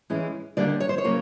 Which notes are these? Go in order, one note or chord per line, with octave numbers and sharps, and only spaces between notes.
A2 E3 G#3 C#4 E4
D#2 D3 G3 A#3 D5
C#5
C5
C#5
C#3 F#3 A#3